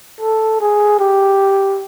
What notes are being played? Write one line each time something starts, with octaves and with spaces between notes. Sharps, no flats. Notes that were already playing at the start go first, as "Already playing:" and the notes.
A4
G#4
G4